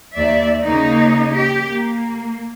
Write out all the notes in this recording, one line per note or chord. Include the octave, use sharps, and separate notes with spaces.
D#2 D5 E5
C#3 A#3 D#4 D#5
G4
A#3